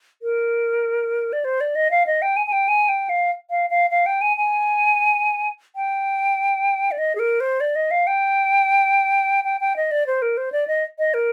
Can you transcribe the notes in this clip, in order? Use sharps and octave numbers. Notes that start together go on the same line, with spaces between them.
A#4
D5
C5
D5
D#5
F5
D#5
G5
G#5
G#5
G5
G#5
G5
F5
F5
F5
F5
G5
G#5
G#5
G5
D5
D#5
G#4
A#4
C5
D5
D#5
F5
G5
G5
G5
D#5
D5
C5
A#4
C5
D5
D#5
D#5
A#4